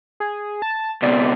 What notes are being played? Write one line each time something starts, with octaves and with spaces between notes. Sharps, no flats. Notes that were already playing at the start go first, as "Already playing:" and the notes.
G#4
A5
C#2 B2 D5